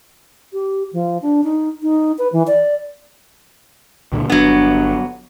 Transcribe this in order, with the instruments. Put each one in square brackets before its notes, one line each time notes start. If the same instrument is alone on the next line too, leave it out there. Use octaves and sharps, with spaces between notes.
[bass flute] G4
F3
D4
D#4
D#4
B4
E3
D5
[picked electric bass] C#2 A#2 D3
[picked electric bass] G1 D4 [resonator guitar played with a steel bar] F#3 B3